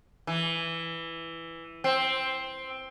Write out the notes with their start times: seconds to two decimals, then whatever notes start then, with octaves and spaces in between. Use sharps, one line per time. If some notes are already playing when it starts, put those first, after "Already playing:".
0.27 E3
1.84 C4